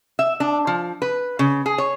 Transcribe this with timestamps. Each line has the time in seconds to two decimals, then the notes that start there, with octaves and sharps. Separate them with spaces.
0.19 E5
0.40 D4
0.67 F3
1.02 B4
1.39 C#3
1.66 G#4
1.78 C#5